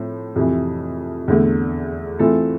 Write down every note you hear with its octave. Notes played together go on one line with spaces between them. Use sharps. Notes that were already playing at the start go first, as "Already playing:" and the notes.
Already playing: A2 F3 C4
F2 C3 E3
E2 D3 A3
E3 A3 C4 F4 A4